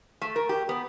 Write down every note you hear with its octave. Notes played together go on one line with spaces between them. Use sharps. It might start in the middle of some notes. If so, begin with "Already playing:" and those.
A3
A#4
G4
B3